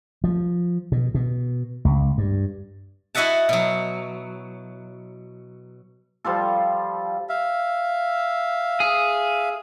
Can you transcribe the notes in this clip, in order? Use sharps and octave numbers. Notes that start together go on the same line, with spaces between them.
F3
B2
B2
C#2
G2
E4 F#4 D#5 E5 F#5 A5
B2 F#3
F3 G3 F4 A4
E5 F5
G#4